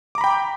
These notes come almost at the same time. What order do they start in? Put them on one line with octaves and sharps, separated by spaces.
D6 A#5 B5 G5